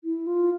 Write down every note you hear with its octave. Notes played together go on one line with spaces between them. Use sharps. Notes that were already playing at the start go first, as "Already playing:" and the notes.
E4
F4